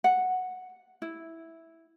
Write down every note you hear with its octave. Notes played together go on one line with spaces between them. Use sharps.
F#5
E4